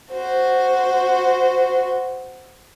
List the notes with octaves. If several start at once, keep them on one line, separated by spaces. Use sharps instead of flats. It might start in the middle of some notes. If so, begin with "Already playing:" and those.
F#4 C5